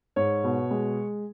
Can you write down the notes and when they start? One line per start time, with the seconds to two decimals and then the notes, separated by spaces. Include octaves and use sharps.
0.16 G#2 C#5
0.44 B2
0.71 G#3